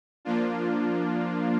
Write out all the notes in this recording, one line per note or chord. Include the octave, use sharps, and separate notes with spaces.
F3 A#3 D4 F4